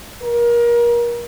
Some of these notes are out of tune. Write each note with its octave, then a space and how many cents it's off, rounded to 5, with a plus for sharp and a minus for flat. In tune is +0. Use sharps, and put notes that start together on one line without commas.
A#4 +30